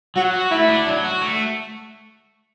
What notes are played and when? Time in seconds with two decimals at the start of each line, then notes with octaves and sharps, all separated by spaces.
0.16 F#3 F#4
0.34 F#4
0.51 A3 E4
0.68 D4
0.87 F#3
1.04 F#4
1.22 A3